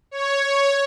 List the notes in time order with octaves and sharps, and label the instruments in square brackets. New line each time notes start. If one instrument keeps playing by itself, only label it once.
[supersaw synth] C#5